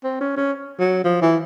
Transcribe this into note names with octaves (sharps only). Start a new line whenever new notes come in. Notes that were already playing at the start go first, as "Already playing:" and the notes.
C4
C#4
C#4
F#3
F3
E3